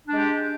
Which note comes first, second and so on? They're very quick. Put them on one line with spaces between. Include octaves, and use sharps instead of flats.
D4 G#3 G4